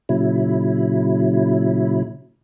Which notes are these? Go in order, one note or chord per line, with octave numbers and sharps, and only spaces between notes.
A#2 C#3 F#3 E4